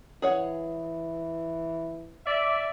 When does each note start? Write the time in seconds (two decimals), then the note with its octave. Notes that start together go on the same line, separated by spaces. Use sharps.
0.22 E3 G#4 C#5 F#5
2.27 D5 E5